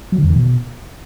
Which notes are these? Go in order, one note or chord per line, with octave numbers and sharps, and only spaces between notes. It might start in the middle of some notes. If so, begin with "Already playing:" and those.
F#3
D3
F2
D#3
B2